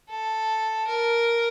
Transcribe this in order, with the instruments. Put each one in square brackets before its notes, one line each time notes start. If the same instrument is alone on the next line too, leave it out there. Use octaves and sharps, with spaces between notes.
[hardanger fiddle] A4
A#4